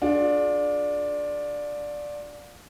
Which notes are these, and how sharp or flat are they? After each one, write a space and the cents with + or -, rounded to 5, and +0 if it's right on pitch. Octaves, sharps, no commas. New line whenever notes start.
D4 +0 F4 +40 G#4 +25